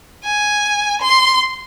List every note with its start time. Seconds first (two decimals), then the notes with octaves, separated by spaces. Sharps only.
0.24 G#5
1.01 C6